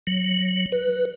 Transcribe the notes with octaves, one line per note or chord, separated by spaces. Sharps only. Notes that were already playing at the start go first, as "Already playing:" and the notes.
F#3
B4